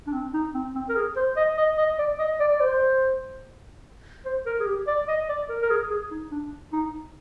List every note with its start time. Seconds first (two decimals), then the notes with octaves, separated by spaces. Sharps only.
0.07 D4
0.13 C4
0.33 D#4
0.54 C4
0.75 C4
0.89 A#4
0.96 G#4
1.16 C5
1.36 D#5
1.57 D#5
1.78 D#5
1.98 D5
2.19 D#5
2.40 D5
2.51 D5
2.60 C5
4.25 C5
4.46 A#4
4.60 G#4
4.66 G4
4.87 D5
5.08 D#5
5.29 D5
5.49 A#4
5.62 A#4
5.70 G#4
5.90 G#4
6.11 D#4
6.31 D4
6.72 D#4